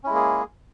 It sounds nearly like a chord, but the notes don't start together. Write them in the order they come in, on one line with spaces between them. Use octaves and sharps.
C#4 E4 G#3 A#3 G#4